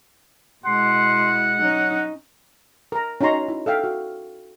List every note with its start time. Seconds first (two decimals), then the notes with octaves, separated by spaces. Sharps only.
0.66 B2 G#3 E4 F#5 C6
1.60 F#3 C#4 D#4
2.92 A#4 A#5
3.21 C#4 D#4 F#4 A#5 C6 C#6
3.48 E4
3.66 A4 E5 F5 G5
3.84 F#4